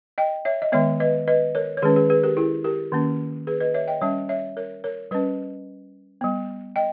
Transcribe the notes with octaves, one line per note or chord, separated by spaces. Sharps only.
D#5 G5
C#5 E5
D#5
D#3 G#3 B3 C#5 E5
B4 D#5
B4 D#5
A#4 C#5
C#5
D#3 G#3 C#4 G#4 B4
G#4 B4
G#4 B4
G4 A#4
E4 G#4
G4 A#4
D#3 A#3 C#4
G#4 B4
B4 D#5
C#5 E5
D#5 G5
G3 C#4 C#5 E5
C#5 E5
A#4 C#5
A#4 C#5
G3 C#4 B4 D#5
G3 B3
D#5 G5